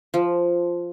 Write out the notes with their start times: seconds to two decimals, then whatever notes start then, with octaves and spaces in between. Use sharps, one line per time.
0.14 F3